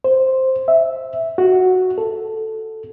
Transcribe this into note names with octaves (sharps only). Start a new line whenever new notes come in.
C5
E5
F#4
A4